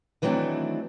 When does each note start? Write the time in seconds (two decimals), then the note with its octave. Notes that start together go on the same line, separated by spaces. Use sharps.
0.22 D#3 E3 F#3 A3 C4 D4